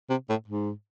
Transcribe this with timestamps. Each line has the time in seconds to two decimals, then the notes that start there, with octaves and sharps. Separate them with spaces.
0.10 C3
0.29 A2
0.48 G#2